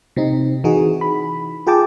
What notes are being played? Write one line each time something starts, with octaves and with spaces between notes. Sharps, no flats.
C3 C4 D#4
E3 D#4 F#4 G#4
B5
F4 G#4 G5 A5 D6